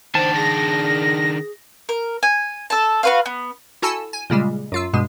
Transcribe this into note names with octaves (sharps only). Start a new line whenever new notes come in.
D#3 D4 C5 A5
G#4 A#6
A#4
G#5
A4 A5
F#4 B4 F5
B3
E4 F#4 A4 G#5 A5 E6
G#5
A#2 C#3 G3 G#3
F#2 F4 E6
G2 B2 G#3